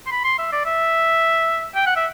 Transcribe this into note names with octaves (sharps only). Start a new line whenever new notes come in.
C6
B5
C6
E5
D5
E5
G5
F#5
E5